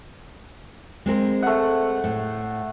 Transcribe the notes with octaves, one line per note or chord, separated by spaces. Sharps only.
G#3 C4 A#4
A3 F#5
A2